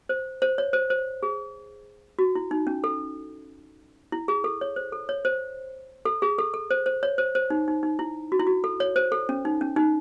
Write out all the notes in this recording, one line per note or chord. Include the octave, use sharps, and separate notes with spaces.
C5
C5
C#5
C5
C5
G#4
F#4
E4
D#4
C#4
A4
E4
G#4
A4
C#5
C5
A4
C#5
C5
A4
G#4
A4
A4
C5
C5
C#5
C5
C5
D#4
D#4
D#4
E4
F#4
E4
F#4
A4
C#5
C5
A4
C#4
D#4
C#4
D#4